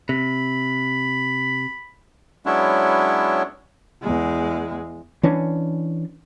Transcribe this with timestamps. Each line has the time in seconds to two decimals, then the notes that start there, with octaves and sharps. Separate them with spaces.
0.09 C3 B5
2.46 F#3 G#3 B3 C#4 D4 E4
4.02 E2 G#3
5.23 E3 C#4 D4